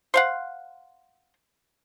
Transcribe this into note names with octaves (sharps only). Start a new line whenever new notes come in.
C5 F5 F#5